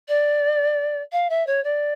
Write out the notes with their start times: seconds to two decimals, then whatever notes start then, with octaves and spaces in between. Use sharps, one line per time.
0.08 D5
1.12 F5
1.30 E5
1.47 C#5
1.64 D5